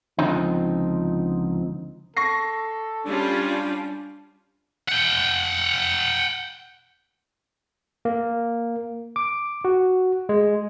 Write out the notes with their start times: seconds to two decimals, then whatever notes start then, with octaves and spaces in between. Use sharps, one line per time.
0.19 C#2 D3 F3 C4 D#4
2.17 A4 C#6 A#6 C7
3.05 G3 C#4 D4 F4
4.89 F#5 G5
8.05 A#3
9.16 D6
9.65 F#4
10.29 G#3